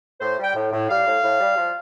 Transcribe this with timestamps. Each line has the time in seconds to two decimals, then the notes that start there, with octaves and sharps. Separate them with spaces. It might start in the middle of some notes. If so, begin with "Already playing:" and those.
0.21 A2 C5
0.38 G3
0.44 G5
0.56 A2
0.73 A2
0.89 G3 F5
1.06 A2
1.23 A2
1.40 G3
1.57 F3